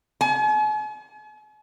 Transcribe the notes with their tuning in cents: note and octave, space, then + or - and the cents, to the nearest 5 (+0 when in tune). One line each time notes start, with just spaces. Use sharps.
G#5 +45